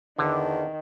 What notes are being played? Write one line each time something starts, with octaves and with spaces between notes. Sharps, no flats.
E2 D3 D#3